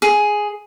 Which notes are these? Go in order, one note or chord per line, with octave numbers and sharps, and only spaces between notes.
G#4